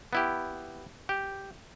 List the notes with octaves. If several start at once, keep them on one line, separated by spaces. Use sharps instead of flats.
B3 E4 G4
G4